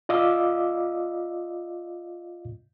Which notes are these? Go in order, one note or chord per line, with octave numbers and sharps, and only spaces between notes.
F4 D5 D#5 F5 D6 E6